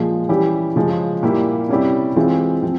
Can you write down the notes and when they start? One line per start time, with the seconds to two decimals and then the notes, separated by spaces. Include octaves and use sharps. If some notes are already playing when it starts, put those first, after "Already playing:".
Already playing: A#2 F3 G#3
0.29 E3 G3 C#4 E4 G4
0.76 C#3 F3 G#3
1.23 A#2 G3 A#3 E4 G4
1.69 C3 G3 C#4 E4 G4
2.16 E3 G#3 C4 F4
2.63 F3 C4